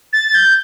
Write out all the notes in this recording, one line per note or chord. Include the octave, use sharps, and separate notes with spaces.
A6
G6